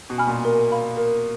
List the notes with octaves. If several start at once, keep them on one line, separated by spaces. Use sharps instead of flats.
B2
G#5 B5 F6
A#2
A#4
F5 B5
A#4